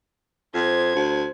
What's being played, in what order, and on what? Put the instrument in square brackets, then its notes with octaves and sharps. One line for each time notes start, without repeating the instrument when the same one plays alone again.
[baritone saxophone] F2 [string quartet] C5 G#6
[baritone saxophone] D2